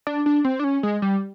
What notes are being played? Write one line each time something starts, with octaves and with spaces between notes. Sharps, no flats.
D4
D4
C4
D4
C#4
G#3
G3